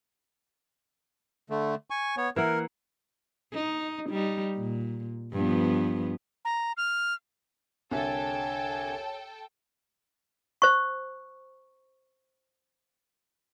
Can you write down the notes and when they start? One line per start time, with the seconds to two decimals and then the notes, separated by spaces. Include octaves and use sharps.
1.50 D3 A3
1.90 G#5 C#6
2.17 B3 C#5
2.36 E3 A#3 A#4 F#5
3.53 D#4
4.10 G3 D#4
4.56 A#2
5.33 G2 F3 B3
6.45 A#5
6.77 F6
7.91 C2 D3 A4 C#5 E5 G5 G#5
10.62 C5 C#6